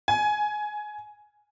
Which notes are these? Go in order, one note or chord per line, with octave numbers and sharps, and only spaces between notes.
G#5